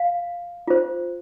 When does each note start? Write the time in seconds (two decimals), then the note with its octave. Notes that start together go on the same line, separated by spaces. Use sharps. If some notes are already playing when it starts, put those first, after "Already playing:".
Already playing: F5
0.68 F4 C5